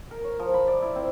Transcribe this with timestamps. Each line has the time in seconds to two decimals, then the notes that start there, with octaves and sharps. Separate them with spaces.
0.11 A#4
0.24 C#5
0.40 F3
0.54 B5
0.68 D5
0.82 E4
0.96 C4